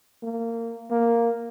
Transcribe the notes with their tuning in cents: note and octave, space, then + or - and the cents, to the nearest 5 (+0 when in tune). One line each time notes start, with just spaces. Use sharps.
A#3 -20
A#3 +0